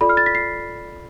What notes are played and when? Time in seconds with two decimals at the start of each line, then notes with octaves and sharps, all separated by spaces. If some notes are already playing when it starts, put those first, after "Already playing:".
0.01 F4 A4 D5 B5
0.09 F6
0.17 A6
0.26 B6
0.35 C7